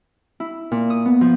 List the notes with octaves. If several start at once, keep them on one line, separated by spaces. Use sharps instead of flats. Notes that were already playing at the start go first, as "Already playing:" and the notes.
E4
A#2
D#6
B3
F3